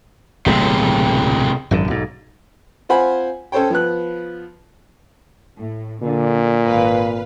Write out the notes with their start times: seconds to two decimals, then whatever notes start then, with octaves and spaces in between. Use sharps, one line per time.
0.46 D1 B1 C3 G#3 A3
1.71 G#1 F#2 D3
1.88 B1 G#2
2.89 C4 F4 C5 F#5 G#5 B5
3.52 C#4 A4 C5 C#5 G5
3.70 F3 B3 F#6
5.57 A2
6.03 A#2 D3
6.64 G#1 B4 F5